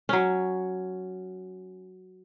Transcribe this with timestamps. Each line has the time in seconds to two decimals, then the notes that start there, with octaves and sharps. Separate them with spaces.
0.09 F#3 C#4